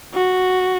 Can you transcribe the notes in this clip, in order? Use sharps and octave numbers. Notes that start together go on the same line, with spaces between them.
F#4